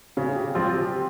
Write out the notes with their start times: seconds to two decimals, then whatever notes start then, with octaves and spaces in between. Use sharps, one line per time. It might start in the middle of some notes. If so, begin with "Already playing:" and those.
0.17 C#3 C#4
0.35 G4
0.55 F3 C4 F4 G4
0.73 G4